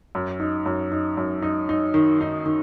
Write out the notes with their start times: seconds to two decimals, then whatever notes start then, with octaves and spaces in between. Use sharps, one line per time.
0.15 F#2
0.40 D#4
0.66 F#2
0.92 D#4
1.17 F#2
1.42 D#4
1.69 D#4
1.94 D#3
2.21 D#4
2.46 D#3